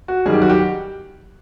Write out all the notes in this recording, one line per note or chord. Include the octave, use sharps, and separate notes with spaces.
F#4
F#2 D#3 G3 G#4
G4
F#4
G4